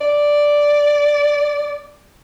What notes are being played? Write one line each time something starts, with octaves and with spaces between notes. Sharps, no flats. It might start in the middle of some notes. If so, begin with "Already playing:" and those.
D5